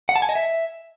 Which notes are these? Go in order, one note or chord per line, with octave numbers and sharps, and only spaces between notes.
F#5
A5
G#5
D#5
E5